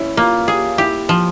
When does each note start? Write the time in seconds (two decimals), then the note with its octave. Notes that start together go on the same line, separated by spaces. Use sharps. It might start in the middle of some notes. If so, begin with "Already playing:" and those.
Already playing: C#4 E4
0.17 A#3 F4
0.48 G4 G#4
0.78 E4 G4
1.09 F3